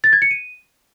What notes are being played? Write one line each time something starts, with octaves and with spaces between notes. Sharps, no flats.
A6
G#6
C#7
D#7